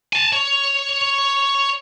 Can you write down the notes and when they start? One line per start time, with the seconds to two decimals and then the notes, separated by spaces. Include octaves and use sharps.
0.13 G#5 A5
0.33 C#5